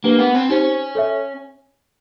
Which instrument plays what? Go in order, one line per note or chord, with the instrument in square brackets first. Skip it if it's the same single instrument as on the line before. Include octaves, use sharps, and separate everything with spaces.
[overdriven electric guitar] A#3 [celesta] D4 G4 B4
[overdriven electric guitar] B3
C4
[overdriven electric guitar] C#4 [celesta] D#4 G4 C5
[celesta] A4 C#5 E5